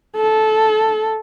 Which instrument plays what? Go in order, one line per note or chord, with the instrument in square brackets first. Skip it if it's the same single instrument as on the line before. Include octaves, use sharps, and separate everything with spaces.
[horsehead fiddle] A4